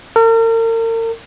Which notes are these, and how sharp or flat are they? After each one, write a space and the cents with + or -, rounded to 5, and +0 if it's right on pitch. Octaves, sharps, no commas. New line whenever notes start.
A#4 -40